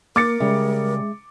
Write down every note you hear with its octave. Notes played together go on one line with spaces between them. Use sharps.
A#3 A#4 D6 A6 C#7
C#3 G3 G#3 G#4 E5